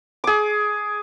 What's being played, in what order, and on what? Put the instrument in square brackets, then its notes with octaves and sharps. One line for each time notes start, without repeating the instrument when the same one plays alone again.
[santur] G#4 D6